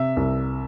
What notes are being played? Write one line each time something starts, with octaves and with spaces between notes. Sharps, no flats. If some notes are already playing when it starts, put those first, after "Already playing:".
Already playing: C3 E5
C2